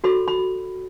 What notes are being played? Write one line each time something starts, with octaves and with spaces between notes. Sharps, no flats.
F#4 A4 C#5 B5
B5